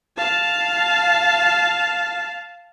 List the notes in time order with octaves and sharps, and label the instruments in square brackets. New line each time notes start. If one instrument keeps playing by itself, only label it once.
[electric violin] F5 A5